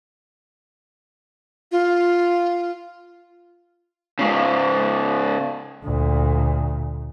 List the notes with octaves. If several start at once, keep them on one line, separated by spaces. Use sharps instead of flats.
F4
G#2 C#3
D2 A#2